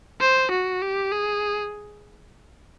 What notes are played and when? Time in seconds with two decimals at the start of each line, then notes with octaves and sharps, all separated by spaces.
0.21 C5
0.51 F#4
0.82 G4
1.11 G#4